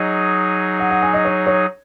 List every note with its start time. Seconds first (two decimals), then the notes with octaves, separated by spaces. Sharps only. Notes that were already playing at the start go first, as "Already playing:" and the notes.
Already playing: F#3 D#4 G#4 D#5
0.80 F#5
0.90 F#5
1.02 G#5
1.14 D#5
1.25 C#5
1.46 C#5